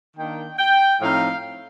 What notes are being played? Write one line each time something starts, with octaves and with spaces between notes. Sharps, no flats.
D#3 A#3 D4 G5
G5
A2 F3 C4 D#4 F5